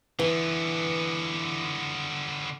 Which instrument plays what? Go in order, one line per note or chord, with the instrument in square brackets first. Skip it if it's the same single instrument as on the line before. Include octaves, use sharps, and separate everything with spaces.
[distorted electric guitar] D3 B3 [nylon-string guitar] E3